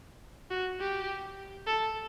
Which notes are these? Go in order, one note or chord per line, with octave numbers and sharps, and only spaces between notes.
F#4
G4
A4